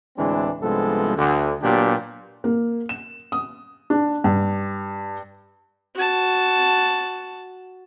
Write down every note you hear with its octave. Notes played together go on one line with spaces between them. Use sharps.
D2 A2 E3 G#3 C4 D4
C2 G2 F3 G#3 B3 A4
D2 D3
A#2 F#3 B3 D4 G4
A#3
E7
D#6
D4
G2
F#4 A5